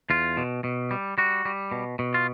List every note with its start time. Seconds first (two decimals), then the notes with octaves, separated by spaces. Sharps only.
0.10 E2 F4
0.37 B2
0.64 B2
0.91 G3
1.18 G3 F#4
1.45 G3
1.72 B2
1.99 B2
2.14 F4